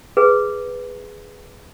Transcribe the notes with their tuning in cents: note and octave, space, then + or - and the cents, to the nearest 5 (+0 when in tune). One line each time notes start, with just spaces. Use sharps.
G#4 +0 B4 +0